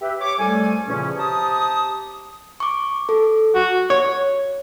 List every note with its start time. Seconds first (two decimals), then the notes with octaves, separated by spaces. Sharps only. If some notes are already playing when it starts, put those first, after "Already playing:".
0.01 G4 B4 E5
0.19 C#5 D6
0.39 C2 G3 A3 A4 G#5
0.86 E2 A#2 C#3 F3 C#4
1.16 C3 G4 A5 A#5 D#6
2.60 C#6 D6
3.09 A4
3.55 F#4
3.90 C#5